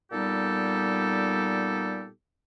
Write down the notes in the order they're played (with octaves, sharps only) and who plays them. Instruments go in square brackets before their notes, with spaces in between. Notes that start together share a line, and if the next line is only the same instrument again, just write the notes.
[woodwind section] A#2 G3 B3 D#4 G4 A4